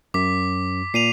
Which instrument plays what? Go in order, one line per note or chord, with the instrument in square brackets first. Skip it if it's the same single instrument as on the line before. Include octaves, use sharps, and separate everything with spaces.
[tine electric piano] F#2 [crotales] D6 B6
[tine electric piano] A#2 [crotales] C7 D#7 F7